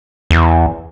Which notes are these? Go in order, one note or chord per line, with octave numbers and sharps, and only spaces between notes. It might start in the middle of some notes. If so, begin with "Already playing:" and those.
E2